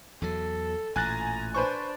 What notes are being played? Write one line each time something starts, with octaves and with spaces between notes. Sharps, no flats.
E2 F#3 A4
A1 A#2 G#5 A#5 F#6 A6
D4 B4 C5 C#6